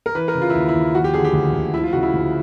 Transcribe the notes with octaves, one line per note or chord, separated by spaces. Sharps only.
A#4
E3 B4
A#4
C#3
F4
E4
D#2
E4
D#2
F3 F#4
G4
D3 G#4
G4
D2
D2
F3 E4
F4
C#3 F#4
E4
D2